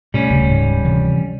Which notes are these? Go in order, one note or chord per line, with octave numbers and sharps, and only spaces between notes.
A2 C3 G3 C#4
D1 C#3
G#2 G#3
C3 E3 F3